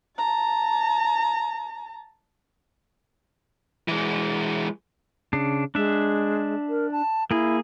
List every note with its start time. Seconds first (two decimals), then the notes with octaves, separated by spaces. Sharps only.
0.17 A5 A#5
3.88 E3 G#3
5.33 C#3 D4
5.75 G#3 D4 E5
6.69 A#4
6.91 A5
7.31 A#3 E4 G#4